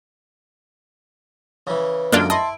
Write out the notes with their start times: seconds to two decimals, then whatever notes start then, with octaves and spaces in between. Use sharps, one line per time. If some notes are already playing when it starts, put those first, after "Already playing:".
1.67 C#3 E3
2.12 F#2 D3 G#3 A#3 D4 F4 D7
2.30 E4 D#5 A5 C6